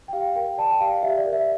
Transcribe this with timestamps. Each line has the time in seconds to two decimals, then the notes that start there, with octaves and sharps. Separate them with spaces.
0.08 G5
0.13 G4 F5
0.35 A#4 G5
0.58 D5 A5
0.71 G5
0.80 G4 F5
1.03 G4 E5
1.18 D5
1.26 A#4
1.33 E5